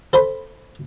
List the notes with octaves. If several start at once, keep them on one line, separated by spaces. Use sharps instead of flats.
A4 C5 B5